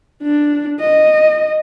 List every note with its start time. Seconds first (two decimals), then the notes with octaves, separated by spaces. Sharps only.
0.22 D4
0.80 D#5